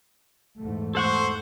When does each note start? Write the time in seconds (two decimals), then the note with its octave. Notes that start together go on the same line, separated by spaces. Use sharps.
0.59 E2 G#2 A3
0.95 A4 C5 F#5 C#6